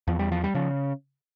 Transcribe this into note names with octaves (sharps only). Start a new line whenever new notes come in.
E2 F3
G3
F3
G3
C#3 F3